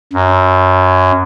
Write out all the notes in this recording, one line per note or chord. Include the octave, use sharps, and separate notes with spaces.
F#2